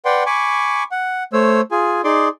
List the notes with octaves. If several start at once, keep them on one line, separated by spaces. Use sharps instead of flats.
B4 D5 F#5 G5 C6
G#5 B5 C#6 D6
F#5
A3 C5 C#5 E6
F4 G#4 G#5
D#4 G#4 D5 C6 D6